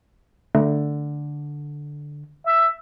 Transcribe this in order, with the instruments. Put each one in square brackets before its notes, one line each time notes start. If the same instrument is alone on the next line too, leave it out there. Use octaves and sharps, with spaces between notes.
[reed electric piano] D3 [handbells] A3
[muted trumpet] E5